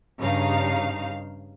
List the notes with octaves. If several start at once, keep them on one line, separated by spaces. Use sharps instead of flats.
G2 C#3 D#4 F5